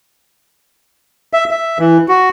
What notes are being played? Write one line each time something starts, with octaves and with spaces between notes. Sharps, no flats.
E5
E5
E3
F#4